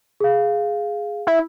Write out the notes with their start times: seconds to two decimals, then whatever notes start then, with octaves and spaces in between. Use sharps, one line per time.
0.20 G#4 F5
1.27 E4